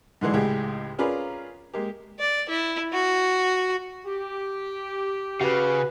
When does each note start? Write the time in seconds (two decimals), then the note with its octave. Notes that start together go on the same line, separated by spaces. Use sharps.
0.21 G#2 D3 E3 G#3 D4
0.33 C#2 A2 G#3 G4 G#4 G5
0.99 C#4 F4 G#4 A#4 B4 D5
1.74 G#3 A#3 G4
2.20 D5
2.49 E4
2.93 F#4
4.05 G4
5.41 C#3 F#4 B4